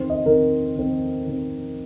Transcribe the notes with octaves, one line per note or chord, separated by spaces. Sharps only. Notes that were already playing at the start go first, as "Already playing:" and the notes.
Already playing: D#3 C4 C5
D#5
D#3 C4 A#4
D#3 C4
D#3 C4